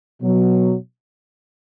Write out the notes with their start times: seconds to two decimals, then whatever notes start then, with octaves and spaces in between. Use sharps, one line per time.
0.21 B2 F#3